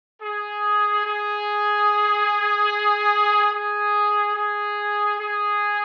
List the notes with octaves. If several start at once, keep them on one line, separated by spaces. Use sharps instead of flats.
G#4
G#4
G#4
G#4
G#4